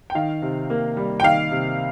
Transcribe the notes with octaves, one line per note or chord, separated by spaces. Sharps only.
G5
D#3 F5
C3
A#3
G3
G5
D#3 F5
C3